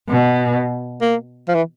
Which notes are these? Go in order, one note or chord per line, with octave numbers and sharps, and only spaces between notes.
B2
A#3
F3
E3